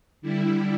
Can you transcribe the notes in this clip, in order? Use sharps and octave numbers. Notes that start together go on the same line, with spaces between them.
D3 G3 E4